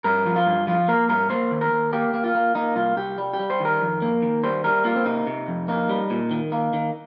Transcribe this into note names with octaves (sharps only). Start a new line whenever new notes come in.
G2 A#4
F3
F4
G2
F3 F4
A#3 A#4
G2 A#4
A#3 C5
D#2
A#4
D#2
A#3 G4
A#3
F4
A#3
A#3 D#4
C2 F4
C2 G4
G3
G4
G3
C5
D#3 A#4
F2
A#3
D#3
G3 C5
G3 A#4
A#3 F4
C4
C3 D#4
C3
F2
A#3 D#4
G3
A#2
D#3
A#3
D#3